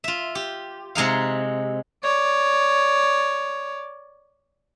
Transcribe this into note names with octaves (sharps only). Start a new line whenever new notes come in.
F4 E5
G4
C3 G#3 D#4 F5
C#5 D5